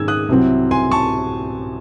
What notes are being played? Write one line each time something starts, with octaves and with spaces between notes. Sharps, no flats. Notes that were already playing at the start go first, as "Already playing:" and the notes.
Already playing: G#2 D#3 G#3 C#4 E6 G#6
D#6 F#6
C2 C3 F#3 C4
G#5 C6
A5 C#6